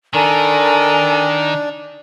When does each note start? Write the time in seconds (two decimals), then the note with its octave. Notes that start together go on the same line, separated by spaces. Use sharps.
0.14 D#3 D4 A4 A#4 G#5